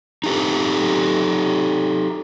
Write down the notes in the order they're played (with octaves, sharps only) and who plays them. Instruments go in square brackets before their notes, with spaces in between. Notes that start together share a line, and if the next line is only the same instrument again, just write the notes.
[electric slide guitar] D#4 G4 A4